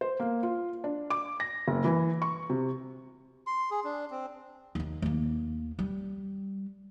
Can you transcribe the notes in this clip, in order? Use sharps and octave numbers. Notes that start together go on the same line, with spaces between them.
C5
A#3
F4
D4
D6
A#6
F#1
E3
C#6
C3
C6
G#4
D4
C4
D#2 D#3
D#2 A#3
G3